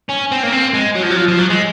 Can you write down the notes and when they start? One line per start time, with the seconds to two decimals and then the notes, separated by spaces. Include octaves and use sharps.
0.09 C#4
0.31 C4
0.43 A#3
0.52 C4
0.74 G#3
0.95 F#3
1.03 F3
1.10 F#3
1.17 F3
1.28 F3
1.38 F#3
1.50 G#3